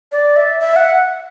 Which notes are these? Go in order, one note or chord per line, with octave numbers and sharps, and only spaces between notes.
D5
E5
E5
F#5